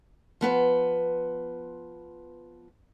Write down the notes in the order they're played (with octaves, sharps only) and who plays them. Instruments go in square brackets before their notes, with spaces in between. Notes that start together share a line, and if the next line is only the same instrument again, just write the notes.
[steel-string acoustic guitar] F3 B3 B4 C5